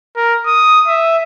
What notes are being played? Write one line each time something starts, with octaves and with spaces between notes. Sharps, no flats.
A#4
D#6
E5